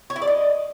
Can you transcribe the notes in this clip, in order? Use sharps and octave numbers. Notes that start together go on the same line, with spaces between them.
C#5
E4
D5
D#5